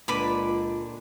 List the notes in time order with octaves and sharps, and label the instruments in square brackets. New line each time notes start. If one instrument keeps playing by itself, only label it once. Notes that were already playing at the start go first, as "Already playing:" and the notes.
[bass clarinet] C#2 [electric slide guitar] A#2 D3 D4 [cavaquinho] B4 B5 D6